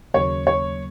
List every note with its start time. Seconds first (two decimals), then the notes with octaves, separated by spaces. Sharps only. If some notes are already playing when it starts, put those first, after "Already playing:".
0.14 D#2 C#3 F#3 A#3 C#5
0.47 C#5